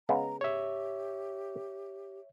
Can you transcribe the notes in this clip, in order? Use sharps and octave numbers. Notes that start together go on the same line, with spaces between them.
C#3 G#3 B3 A#5
G4 C#5 E5